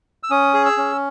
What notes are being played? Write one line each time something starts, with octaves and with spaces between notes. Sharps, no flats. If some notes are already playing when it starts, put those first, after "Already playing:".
E6
C#4 D#6
G#4
E6
C#4